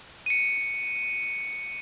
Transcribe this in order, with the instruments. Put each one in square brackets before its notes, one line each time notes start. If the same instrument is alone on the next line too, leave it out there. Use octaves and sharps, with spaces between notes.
[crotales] C#7 D#7